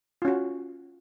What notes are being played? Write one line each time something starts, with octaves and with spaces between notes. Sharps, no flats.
C#4 F4 F#4